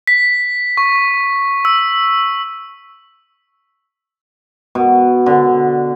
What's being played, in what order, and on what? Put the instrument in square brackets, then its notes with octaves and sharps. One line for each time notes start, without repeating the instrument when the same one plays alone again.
[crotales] B6
C#6
E6
[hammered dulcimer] B2
D3